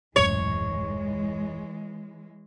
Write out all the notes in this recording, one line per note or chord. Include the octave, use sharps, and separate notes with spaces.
D#1 F#2 A2 E3 G#3 C#5